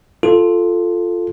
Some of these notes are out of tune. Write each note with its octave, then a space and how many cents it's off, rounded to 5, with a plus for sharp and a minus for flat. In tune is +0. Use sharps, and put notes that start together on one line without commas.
F4 +0 A4 +0